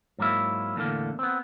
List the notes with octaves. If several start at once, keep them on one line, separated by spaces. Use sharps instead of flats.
G#2 F#3 A#3 E4
E2 A2 D3 A#3
B3 C4